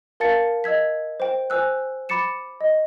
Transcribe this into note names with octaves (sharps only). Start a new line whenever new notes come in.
A#4 F5 A5 A6 C#7
D#5 E6 G#6 B6
C5 G5
C5 G#5 E6 F#6
B5 D6 A6 C#7 E7
D#5